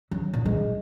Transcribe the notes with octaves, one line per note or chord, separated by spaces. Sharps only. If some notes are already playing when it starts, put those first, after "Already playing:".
F#3
A#2
G#3